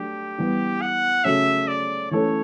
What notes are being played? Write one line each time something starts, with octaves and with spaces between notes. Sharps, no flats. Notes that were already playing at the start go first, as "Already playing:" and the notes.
Already playing: F#3 A3 D4 G4
E3 G3 B3
F#5
C#3 F#3 A3 C#4 E5
D5
E3 A3 C#4 C#5